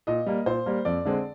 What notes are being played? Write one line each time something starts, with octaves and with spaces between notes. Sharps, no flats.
A#2 D#5
G3 A#3
A#2 C5
G3 A#3
F2 D5
D3 G#3 C4